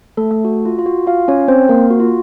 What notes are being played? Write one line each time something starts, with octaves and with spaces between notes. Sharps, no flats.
A3 A4
A3 A4
F#4
F4
F4
F#4
F4 F5
C#4 C#5
C4 C5
A#3 A#4
F#4
F4